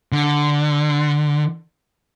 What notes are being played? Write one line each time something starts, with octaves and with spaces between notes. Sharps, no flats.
D3